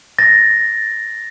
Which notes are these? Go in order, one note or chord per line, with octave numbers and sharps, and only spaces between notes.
A6 A#6